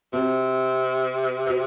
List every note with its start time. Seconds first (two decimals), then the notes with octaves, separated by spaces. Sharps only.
0.13 C3 C4 F#4 C5
1.47 F#4 C5